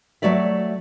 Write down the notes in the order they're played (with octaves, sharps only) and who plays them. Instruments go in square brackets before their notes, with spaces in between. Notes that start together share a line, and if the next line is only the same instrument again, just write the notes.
[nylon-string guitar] F#3 A3 F#4 D5 E5